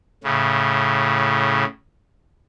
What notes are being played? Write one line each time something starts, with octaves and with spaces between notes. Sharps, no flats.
A2 C#3